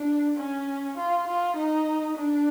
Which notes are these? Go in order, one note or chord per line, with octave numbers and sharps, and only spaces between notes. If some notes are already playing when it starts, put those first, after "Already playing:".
Already playing: D4
C#4
F4
F4
D#4
D4